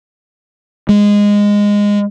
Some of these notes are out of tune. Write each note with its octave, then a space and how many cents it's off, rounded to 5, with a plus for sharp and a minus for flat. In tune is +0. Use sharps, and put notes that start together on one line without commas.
G#3 -15